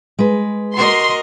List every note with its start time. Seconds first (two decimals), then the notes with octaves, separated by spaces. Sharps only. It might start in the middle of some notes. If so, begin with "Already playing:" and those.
0.19 G#3 B4
0.75 F#4 A#4 D#5 C6